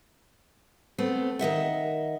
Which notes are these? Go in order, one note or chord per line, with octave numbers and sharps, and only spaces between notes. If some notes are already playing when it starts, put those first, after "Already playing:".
A3 B3 C4
D#3 D#5 E5 F#5